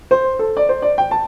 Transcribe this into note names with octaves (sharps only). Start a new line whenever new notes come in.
C5
A4
D5
C5
D5
G5
A5